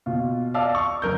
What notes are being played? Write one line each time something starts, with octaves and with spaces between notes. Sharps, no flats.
B2 F4
D5 D#5 F5 A5 E6
C#6
F#1 A#4 G6